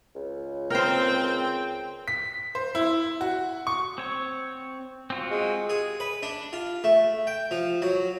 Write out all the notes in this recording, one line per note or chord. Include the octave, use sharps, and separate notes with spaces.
C#2
C4 A#4 C5 G5
B6
C5
E4
F#4
C#6
C4 C#5
C4 F4 F#4
G#3
G#4
B4
D4
F4
A3
G5
F3
F#3